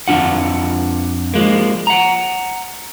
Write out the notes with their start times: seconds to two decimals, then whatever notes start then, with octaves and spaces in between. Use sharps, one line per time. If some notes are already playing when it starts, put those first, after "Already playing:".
0.08 F2 D4 F4 F#5
1.34 F3 G#3 A#3
1.87 F#5 A#5